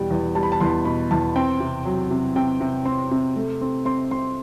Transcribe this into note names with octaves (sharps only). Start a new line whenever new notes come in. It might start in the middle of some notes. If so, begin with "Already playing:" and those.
Already playing: E2 B2 G3 G5
E2
G3 A5
B5
A5
E2 C6
B2 B5
E2 A5
C4 G5
C3
F#3
C3
C3 G5
C3
C4 C6
C3
A3
C4
C4 C6
C4 C6